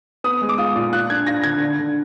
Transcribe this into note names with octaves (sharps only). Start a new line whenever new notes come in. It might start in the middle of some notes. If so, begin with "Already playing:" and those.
B3 D#6
G#3
D6
F4 D#6
A#2
F4 F#6
D4 G#6
F4 A#6
D3 G#6
D3
D3